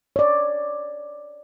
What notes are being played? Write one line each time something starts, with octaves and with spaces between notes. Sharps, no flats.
C#5 D5